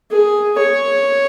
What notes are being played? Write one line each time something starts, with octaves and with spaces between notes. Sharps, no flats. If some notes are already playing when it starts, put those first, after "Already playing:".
G#4
C#5